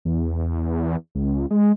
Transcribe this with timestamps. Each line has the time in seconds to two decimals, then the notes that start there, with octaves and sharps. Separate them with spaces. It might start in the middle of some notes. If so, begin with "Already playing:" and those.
0.05 E2
1.15 C#2
1.51 G#3